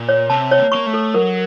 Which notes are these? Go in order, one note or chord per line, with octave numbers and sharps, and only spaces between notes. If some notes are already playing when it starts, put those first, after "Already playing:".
Already playing: A#2
C#5
C3 A5
C#5
A#3
A#3 C#6
A3
A4
F#3 A#4